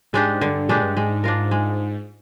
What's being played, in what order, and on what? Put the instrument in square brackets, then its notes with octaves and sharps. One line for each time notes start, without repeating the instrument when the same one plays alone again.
[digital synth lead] G#2 [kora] G#3 D4 G4
[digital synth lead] G2 [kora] D3
[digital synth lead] G2
[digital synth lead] A#2 [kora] G#3 D4 G4
[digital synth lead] G2
[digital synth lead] G#2 [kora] G#3
[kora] D4 F4 A#4
G#3